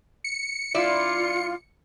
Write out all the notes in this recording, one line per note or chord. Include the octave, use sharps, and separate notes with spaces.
C#7
G2 E4 F4 D5